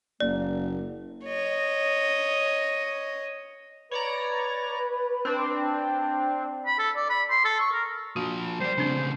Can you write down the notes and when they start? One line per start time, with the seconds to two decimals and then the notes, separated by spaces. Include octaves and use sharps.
0.20 F#1 A#3 D5
1.26 C#5 D#5
3.91 B4 C#5 D5 A#5
5.25 C4 D4
6.66 B5
6.79 A4
6.96 D5
7.10 B5
7.30 C6
7.45 A4
7.60 C#6
7.73 A#4
8.16 F3 A#3 F#4
8.60 G3 C5 D5
8.78 A2 C#3 C4 D4